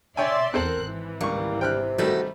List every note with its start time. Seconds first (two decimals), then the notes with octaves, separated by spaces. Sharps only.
0.17 C#5 D5 E5 G5 G#5 C6
0.54 E2 C4 A4 A#4 C5 F#6
0.85 G#1 E3
1.21 C#2 G3 A#3 C#6
1.61 C3 G5 F6 F#6
1.98 D#3 G3 A3 F#4 A4